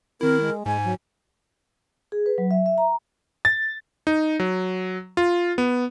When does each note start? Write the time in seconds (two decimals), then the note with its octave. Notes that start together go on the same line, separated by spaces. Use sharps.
0.21 D#3 C4 E4 A#4
0.40 G#3
0.66 G#2 G#3 G#5
0.84 F#3
2.12 G#4
2.26 B4
2.38 F#3
2.51 E5
2.66 E5
2.78 A#5
3.45 A6
4.07 D#4
4.40 F#3
5.17 F4
5.58 B3